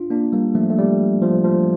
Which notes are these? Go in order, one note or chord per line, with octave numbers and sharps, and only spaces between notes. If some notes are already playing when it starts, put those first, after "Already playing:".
Already playing: D4 F4
A#3 D4
G3 A#3
F3 A3
A3
G3
F3
F3